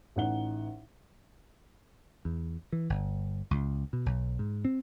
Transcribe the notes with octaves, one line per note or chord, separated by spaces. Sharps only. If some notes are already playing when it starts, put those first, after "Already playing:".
A1 D#4 F#5 G7
E2
E3
G1
C#2
B2
B1
G#2
C4